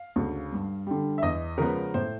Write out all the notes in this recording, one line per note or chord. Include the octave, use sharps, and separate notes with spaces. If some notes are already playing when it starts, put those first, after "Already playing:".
Already playing: F5
D2 C#3
G2
D3 G3
E5
E2 D#5
C#3 F3 G#3 B3 A#4
A2 C5